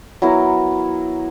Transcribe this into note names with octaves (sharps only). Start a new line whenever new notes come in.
F#3 B3 E4 A#4